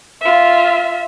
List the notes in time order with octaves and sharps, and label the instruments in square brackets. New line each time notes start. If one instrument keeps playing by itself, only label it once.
[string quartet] F4 E5